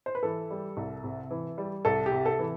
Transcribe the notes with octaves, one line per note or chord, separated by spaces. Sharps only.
C5
B4
E3 A4
G3
C2
C3
E3
G3
C2 A4
G4
C3
A4
E3